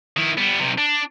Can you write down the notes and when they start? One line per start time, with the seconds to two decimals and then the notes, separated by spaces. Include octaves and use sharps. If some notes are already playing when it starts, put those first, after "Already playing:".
0.17 D#3 E4
0.38 G3 B3
0.60 B1 C3
0.78 D4